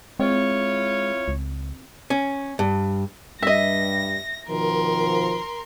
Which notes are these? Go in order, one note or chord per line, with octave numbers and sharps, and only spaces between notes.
G#3 C4 E4 F4 C#5
C#2
C#4
G2
G2 G3 D#5 E5 A#6
B2 D#3 F3 A#4 C6